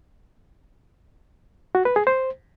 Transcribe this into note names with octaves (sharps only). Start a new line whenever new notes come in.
F#4
B4
G#4
C5